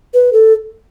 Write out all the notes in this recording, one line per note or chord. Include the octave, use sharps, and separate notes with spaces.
B4
A4